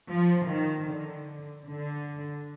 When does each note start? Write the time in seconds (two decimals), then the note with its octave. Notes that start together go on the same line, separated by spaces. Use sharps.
0.10 F3
0.49 D#3
0.89 D3
1.68 D3